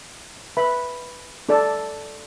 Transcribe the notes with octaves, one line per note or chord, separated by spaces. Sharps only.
B4 E5 B5
D4 A4 D5 A5